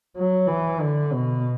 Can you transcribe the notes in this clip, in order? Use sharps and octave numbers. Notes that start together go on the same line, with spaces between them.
F#3
E3
D3
B2